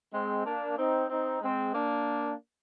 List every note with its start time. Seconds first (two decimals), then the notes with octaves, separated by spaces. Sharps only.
0.13 G#3 C4
0.45 A#3 D4
0.77 C4 D#4
1.10 C4 D#4
1.42 G#3 C4
1.75 A#3 D4